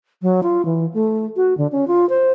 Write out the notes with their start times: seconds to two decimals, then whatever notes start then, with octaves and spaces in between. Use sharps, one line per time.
0.22 F#3
0.43 F4
0.65 E3
0.94 A3
1.36 F#4
1.58 D3
1.72 C#4
1.87 F4
2.09 C5